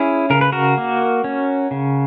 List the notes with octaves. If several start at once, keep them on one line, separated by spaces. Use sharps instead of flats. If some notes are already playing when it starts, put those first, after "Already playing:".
Already playing: C#4 E4 G#4
C#3 A#4
B4
F#4 A#4
A#3
C#4
C#3